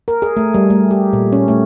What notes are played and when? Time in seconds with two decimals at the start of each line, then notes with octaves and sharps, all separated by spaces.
0.08 A#4
0.22 G#4
0.37 A3
0.54 G3
0.70 A3
0.91 G4
1.13 A#2
1.33 C#4
1.48 A3